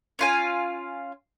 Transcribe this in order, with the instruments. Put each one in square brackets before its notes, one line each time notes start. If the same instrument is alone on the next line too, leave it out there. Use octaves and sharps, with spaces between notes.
[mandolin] C#4 F4 G#5